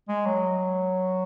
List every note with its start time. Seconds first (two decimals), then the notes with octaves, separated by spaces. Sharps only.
0.08 G#3
0.26 F#3